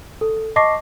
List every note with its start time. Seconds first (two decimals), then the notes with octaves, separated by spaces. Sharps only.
0.21 A4
0.56 D#5 A5 C#6 D6 A#6 C7